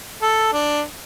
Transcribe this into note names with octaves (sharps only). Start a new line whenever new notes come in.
A4
D4